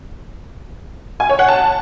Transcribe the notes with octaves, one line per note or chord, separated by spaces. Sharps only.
G#5
C#5
F#5
A5